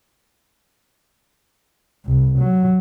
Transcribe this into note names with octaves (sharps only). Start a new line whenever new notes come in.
C2
F#3